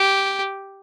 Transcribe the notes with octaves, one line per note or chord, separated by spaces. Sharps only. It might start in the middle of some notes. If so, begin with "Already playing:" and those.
Already playing: G4